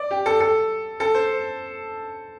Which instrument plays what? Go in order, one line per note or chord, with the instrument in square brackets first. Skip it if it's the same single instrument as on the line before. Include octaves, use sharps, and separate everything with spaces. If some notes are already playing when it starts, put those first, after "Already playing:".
Already playing: [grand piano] D5
G4
A4
A4
A4
C5